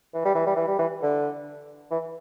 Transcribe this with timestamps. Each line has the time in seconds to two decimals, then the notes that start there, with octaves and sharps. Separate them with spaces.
0.14 E3
0.25 G3
0.35 E3
0.47 G3
0.56 E3
0.67 G3
0.79 E3
1.03 D3
1.91 E3